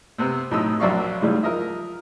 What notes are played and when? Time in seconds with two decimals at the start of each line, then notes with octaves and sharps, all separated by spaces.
0.18 C3 B3 C4
0.51 B1 A2 A3 D#4 D#6 E6
0.80 A#1 F#3 D5 E5 F5 C#6
1.21 G#2 C#3 E3 F#3 G3 A3
1.43 F3 A#4 D#5 E5